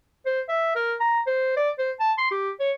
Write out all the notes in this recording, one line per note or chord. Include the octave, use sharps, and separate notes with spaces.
C5
E5
A#4
A#5
C5
D5
C5
A5
C6
G4
C#5